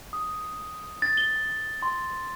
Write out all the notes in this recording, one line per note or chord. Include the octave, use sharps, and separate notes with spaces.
D#6
A6
G7
C6